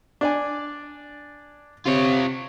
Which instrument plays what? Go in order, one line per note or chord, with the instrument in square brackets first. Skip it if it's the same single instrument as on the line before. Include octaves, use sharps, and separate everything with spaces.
[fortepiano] D4 D5 G#5
[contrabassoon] C3 [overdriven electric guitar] F4 C#5